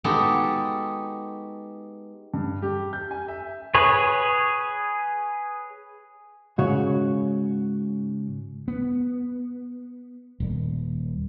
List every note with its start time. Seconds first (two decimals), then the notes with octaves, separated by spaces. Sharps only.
0.04 G#3 B3 D#4 F#4 G4 A4
2.34 G2
2.62 G4
2.93 G6
3.11 G#5
3.28 E5
3.75 G#4 B4 C#5
6.58 G#2 C#3 F#4 C#5
8.68 B3
10.40 D#1